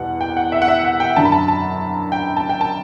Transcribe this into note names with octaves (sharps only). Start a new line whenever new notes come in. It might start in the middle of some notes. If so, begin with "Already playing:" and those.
Already playing: E2 B2 G3 F#5
G5
F#5
E5
F#5
E5
F#5
G5
F#2 D3 F#3 A5
B5
A5
A5
G5
A5
G5
A5